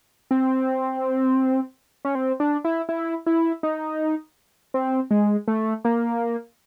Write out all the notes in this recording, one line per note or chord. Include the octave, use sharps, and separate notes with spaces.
C4
C#4
C4
D4
E4
E4
E4
D#4
C4
G#3
A3
A#3